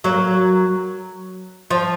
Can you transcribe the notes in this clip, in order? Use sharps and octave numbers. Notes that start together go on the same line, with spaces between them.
F#3 A#3
F3